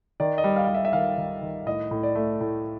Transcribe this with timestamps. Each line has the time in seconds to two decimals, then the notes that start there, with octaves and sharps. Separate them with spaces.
0.20 D#3 D5
0.38 D#5
0.44 G3
0.56 F5
0.69 G3
0.74 E5
0.85 E5
0.93 D#3 F5
1.18 D#3
1.42 D#3
1.66 A2 D#5
1.91 A2
2.03 D5
2.16 A3
2.41 A2